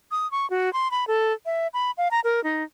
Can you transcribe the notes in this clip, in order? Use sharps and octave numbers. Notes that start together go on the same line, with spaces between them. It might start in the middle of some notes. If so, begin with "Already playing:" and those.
D#6
C#6
F#4
C6
B5
A4
E5
B5
F5
A#5
A#4
D#4